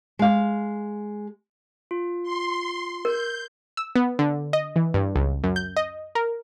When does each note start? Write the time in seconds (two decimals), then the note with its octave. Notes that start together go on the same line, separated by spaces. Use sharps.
0.19 G#3 F5
1.91 F4
2.23 C6
3.05 A#4 G6
3.77 E6
3.96 B3
4.19 D3
4.53 D#5
4.76 E3
4.94 G2
5.16 C#2
5.44 F#2
5.56 G6
5.77 D#5
6.15 A#4